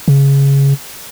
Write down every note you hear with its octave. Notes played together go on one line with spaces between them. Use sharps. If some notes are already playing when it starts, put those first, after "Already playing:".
C#3